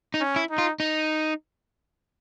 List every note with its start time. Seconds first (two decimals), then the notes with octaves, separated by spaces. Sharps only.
0.14 D#4
0.21 C#4
0.36 E4
0.51 D#4
0.58 F4
0.80 D#4